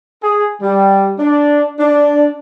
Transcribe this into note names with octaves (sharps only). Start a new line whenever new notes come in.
G#4
G3
D4
D4